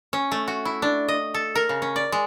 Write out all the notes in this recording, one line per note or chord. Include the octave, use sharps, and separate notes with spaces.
C#4
A3
F#4
E4
D4
D#5
A4
A#4
C#3
C#4
D5
G#3